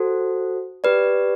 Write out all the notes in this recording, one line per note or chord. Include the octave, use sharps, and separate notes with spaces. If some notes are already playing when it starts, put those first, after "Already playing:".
Already playing: F#4 A4 C5
G4 B4 D5